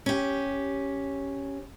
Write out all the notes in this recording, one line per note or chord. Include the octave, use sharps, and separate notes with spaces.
C#4 G4